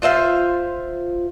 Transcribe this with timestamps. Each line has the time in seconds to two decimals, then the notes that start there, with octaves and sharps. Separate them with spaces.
0.02 F4 C5 E5 F5